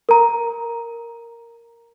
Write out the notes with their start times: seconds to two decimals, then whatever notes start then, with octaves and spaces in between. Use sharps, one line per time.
0.09 A#4 A#5